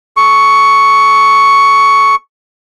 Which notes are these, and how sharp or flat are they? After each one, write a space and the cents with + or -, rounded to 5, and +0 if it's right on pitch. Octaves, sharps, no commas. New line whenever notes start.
A4 -30 C#6 +5